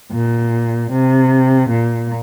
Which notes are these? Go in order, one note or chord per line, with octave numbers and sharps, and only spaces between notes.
A#2
C3
A#2